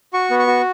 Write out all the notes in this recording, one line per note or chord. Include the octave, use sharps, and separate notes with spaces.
F#4 C#6
B3
C#6
F#4